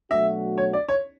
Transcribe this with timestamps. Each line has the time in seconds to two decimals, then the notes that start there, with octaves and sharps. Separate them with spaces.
0.11 B2 F#3 A3 D4 F#4 E5
0.58 C#5
0.73 D5
0.89 C#5